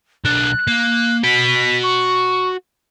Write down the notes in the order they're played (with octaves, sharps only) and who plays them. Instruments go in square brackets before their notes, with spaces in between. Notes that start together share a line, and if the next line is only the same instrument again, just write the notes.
[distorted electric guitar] B1 D4 [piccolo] F#6
[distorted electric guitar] A#3
[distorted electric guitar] F#4 B5 [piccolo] B6
[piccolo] C#6